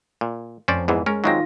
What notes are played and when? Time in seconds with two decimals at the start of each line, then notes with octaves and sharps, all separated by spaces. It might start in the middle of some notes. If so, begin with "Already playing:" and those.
0.21 A#2
0.68 F2 C#4 C5 D5
0.88 E2 G#2 E3
1.06 G#3 C#4 A#4
1.24 D#3 F#3 G#3 C4 F4 A#6